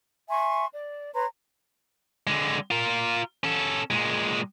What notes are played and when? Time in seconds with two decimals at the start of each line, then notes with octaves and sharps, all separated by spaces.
0.29 E5 G#5 C6 C#6
0.74 D5
1.14 B4 C#5 A#5 C6
2.27 D3 G#3
2.71 F4 A#4
3.44 C#4 A4
3.91 A#2 G#3